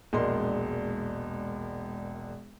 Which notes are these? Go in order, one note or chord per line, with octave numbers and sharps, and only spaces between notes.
E1 A#1 G#3 A#4 D#5 C6